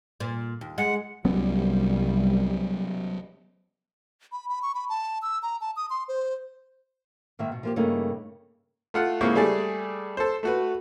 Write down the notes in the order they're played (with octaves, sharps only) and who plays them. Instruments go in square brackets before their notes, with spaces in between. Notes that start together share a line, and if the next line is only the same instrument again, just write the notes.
[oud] A#2
D#2
[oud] G#3 [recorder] F#5
[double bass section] C2 G3 [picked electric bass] F#3 B3 C#4
[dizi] B5
B5
C#6
B5
A5
E6
A#5
A5
D#6
C6
C5
[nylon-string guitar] G#2 D#3 A#3 E5
B2
F3 A#3 G4
G2 C#3 A3 A#3 D#4
[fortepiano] A3 F4 F#5
G#2 C#3 A#3 E4 F5 C#6
G3 A3 G#4 D5
A4 C5
A3 F#4 B4